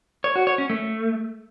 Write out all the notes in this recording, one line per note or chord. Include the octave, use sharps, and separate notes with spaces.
C#5
F#4
C#5
C#4
A3